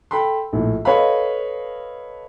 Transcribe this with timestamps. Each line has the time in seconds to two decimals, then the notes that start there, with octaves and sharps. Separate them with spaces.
0.11 A4 G5 B5 C6
0.53 A#1 A2
0.85 A4 B4 C#5 D#5 F5 B5